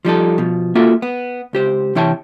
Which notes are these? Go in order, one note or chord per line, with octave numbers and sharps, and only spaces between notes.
F3 G3 D#4 A4
B2 F3
A#3 F4 F#4 A4 E5
B3
C#2 G4 C5
C3 E3 E4 C#5 G5 A5